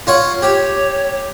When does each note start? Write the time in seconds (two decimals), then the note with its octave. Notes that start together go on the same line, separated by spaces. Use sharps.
0.07 F4 C#5 F#5
0.42 G4 C#5